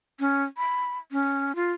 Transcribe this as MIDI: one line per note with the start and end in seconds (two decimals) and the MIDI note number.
0.20 0.44 61
0.57 0.99 83
1.12 1.55 61
1.55 1.72 65